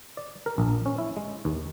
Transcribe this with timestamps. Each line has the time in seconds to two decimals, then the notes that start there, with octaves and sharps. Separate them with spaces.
0.17 D5
0.46 A#4
0.58 A#1
0.86 C#4
0.98 E4
1.17 G#3
1.45 D#2